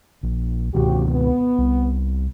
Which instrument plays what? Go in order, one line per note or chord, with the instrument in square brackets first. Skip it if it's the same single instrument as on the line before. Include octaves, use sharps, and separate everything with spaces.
[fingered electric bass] A#1
[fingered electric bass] C#2 B2 D#3 [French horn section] F3 F#4 G4
[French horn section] B3
[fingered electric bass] C2